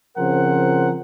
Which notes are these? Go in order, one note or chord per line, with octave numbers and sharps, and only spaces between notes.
C#3 F3 C4 A#4 C5 F#5